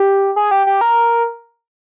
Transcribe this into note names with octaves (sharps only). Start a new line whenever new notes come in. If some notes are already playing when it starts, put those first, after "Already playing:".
Already playing: G4
G#4
G4
G4
A#4